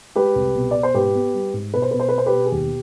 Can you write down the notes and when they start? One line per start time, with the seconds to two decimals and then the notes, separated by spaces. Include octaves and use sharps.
0.16 G#3 G4 B4
0.36 C2
0.55 B2
0.71 B2 D5
0.83 C5
0.94 G#2 G4 B4
1.15 B3
1.34 G3
1.54 G#2
1.74 B2 B4
1.82 C5
1.91 B2 B4
2.00 C5
2.09 B4
2.13 B3
2.18 C5
2.26 G4 B4
2.33 B2
2.45 G#4
2.52 D#2 G4